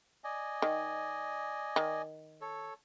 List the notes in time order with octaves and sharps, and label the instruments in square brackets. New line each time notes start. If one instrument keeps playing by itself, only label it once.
[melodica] D5 D#5 G#5
[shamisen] D#3
D#3
[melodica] A4 C#5